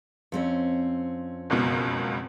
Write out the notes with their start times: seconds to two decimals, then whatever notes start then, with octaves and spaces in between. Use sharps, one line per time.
0.32 F2 C4 C#4
1.50 F#1 C#2 B2